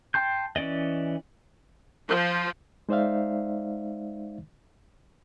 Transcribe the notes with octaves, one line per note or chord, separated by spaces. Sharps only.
G5 A5 C6 G6
E3 C#4 D5 D#5
F3
G#3 D#4 C5 D5 E5 F5